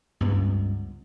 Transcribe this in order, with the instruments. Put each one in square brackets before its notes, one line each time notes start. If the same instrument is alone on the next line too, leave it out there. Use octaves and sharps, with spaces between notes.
[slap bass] C#2 G2 B3